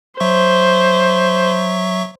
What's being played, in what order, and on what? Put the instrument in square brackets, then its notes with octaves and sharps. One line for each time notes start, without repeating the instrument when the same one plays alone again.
[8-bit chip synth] F#3 E5 C#6 [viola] C5